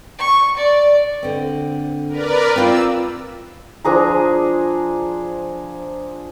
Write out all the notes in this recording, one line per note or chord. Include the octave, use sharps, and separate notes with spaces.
C#6
D5
D3 C4
A#4 B4 D5
C4 F4 E6
F3 D4 G#4 A#5